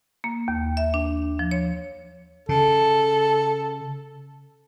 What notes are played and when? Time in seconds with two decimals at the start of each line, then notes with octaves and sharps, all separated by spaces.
0.24 A#3
0.48 D#2
0.77 E5
0.94 D4
1.39 F3
1.51 C#5
2.49 C#3 A4